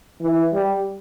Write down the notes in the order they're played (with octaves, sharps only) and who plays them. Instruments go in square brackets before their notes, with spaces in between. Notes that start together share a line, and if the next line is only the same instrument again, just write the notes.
[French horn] E3
G3